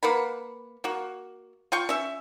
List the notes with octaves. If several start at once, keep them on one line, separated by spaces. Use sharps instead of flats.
A#3 B4 F#5 B5
A#3 F#4
F4 G5 C#6
C#4 E5